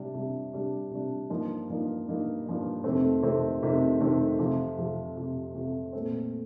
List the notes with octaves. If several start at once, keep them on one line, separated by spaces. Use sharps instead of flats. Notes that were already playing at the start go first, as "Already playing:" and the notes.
Already playing: C3 G3 D4
C3 G3 D4
C3 G3 D4
C3 G3 D4
G2 F3 A#3 D#4
G2 F3 A#3 D#4
G2 F3 A#3 D#4
G2 F3 A#3 D#4
F2 C3 D#3 A3 C4
F2 C3 D#3 A3 C4
F2 C3 D#3 A3 C4
F2 C3 D#3 A3 C4
F2 C3 F3
F2 C3 F3
F2 C3 F3
F2 C3 F3
A#2 A3 C4